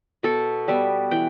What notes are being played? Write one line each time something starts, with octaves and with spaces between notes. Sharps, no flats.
B2 A4
G3 B3 E5
E3 G5